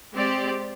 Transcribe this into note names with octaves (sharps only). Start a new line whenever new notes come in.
G#3 C4 G4 D5